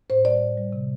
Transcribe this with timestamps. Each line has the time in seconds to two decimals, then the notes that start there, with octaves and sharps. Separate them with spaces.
0.10 A2 C5
0.25 G3 D5
0.41 A2
0.58 G3
0.73 C3